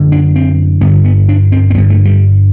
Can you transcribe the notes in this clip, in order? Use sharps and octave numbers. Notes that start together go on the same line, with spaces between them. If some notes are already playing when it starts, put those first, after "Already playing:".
Already playing: F#2 D3
D4
C4
G2 D3 B3
B3
D4
C4
C4
G2 D3 B3
A3
G3